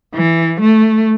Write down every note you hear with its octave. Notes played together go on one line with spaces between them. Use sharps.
E3
A3